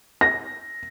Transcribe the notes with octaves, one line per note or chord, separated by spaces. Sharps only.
A#6